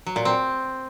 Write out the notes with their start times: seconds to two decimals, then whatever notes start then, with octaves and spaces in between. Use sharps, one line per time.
0.06 F#3
0.16 A#2
0.25 C4